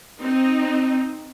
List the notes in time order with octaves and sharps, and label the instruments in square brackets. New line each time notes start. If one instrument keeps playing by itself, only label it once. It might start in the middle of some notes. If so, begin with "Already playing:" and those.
[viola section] C4 D#4